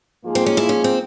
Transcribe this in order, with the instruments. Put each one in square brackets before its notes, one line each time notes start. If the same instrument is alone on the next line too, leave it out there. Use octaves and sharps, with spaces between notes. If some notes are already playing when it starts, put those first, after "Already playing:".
[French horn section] G#2 F3 A#3 F4 G#4
[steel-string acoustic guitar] C4
C#4
E4
C#4
C4